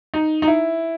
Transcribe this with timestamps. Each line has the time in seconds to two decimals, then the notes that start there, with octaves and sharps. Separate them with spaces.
0.14 D#4
0.42 D#4
0.47 E4